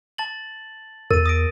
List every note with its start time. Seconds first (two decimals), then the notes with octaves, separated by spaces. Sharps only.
0.18 A5 A6 F#7
1.11 E2 A#4 A6 D#7
1.26 D#6 A#6 D7